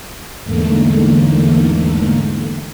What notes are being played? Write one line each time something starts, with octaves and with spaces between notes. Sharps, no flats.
E2 G#2 D3 A3 A#3